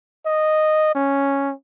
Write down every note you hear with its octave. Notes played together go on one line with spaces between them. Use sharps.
D#5
C#4